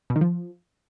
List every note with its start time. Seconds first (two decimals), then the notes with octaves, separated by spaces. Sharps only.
0.10 B2
0.16 D#3
0.21 F3